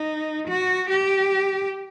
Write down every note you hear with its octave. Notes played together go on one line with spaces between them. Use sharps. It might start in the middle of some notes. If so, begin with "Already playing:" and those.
Already playing: D#4
F#4
G4